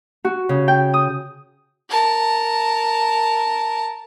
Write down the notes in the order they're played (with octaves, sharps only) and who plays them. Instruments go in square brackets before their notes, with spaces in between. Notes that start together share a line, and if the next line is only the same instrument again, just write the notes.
[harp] F#4
C#3
G5
D#6
[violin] A#4 A5